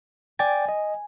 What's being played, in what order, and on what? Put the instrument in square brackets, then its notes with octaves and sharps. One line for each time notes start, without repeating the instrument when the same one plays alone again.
[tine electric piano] D5 G5 A6 [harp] G#5
[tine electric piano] D#5